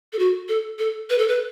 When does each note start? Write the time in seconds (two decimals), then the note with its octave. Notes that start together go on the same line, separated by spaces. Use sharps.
0.13 A4
0.19 F#4
0.49 A4
0.79 A4
1.10 B4
1.18 A4
1.28 B4